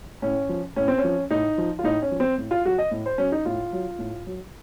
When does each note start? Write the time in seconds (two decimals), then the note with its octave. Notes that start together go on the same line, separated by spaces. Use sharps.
0.22 A2 C#4
0.49 F3
0.76 A2 C#4
0.88 C4
0.98 C#4
1.04 F3
1.31 A2 D#4
1.58 F3
1.79 F4
1.84 A2 D#4
2.02 C#4
2.11 F3
2.20 C4
2.38 A2
2.51 F4
2.65 F#3 F#4
2.78 D#5
2.91 A2
3.06 C5
3.18 F#3 C#4
3.32 D#4
3.45 A2 F4
3.73 F#3
3.99 A2
4.27 F#3